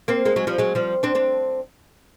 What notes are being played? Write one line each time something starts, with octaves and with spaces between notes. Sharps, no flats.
A#3 C4
G#3 A#3
F#3 G#3
F3 G3
F#3 G#3
F3 G3
C4 D4
C4 D4